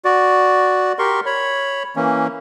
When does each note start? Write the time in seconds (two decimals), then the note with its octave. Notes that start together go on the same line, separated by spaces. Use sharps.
0.05 F#4 D5
0.99 G4 A#4 C6 C#6
1.26 C#5 B5
1.96 E3 A#3 C#4